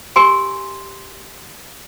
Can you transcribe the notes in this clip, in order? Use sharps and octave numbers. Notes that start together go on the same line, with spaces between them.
G4 A#4 G#5 C6